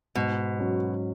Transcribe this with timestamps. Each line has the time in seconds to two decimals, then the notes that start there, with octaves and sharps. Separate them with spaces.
0.15 G#2 B2
0.59 F#3 C#4